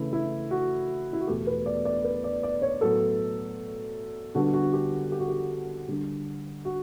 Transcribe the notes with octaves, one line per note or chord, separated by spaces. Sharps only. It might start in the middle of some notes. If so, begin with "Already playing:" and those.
Already playing: C#3 E3 A3 E4
E4
F#4
E4
F#4
E2 B2 A3 G4
B4
D5
D5
B4
D5
D5
C#5
A2 F#3 B3 A4
D3 G3 B3 D4 F#4
F#4
G4
G4
F#4
G4
D3 G3 D4
F#4